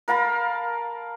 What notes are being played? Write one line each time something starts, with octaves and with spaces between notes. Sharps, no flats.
A#4 F5 A5 B5